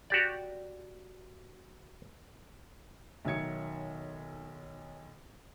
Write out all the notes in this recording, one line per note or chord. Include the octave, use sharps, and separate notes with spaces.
F#4 G4 D5
B1 D#3 F#3 E5 G#6 C#7